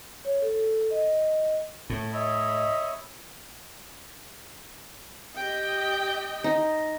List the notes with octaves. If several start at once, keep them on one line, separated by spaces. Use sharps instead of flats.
C#5
A4
D#5
A2 A3
C#5 D#5 E5 B5
G4 D#5 G5
D#4